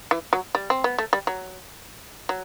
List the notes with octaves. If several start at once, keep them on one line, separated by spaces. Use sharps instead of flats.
E3
F#3
G3
C4
B3
A3
G3
F#3
F#3